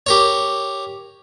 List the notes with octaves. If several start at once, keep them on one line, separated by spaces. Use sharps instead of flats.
G4 A#4 C#5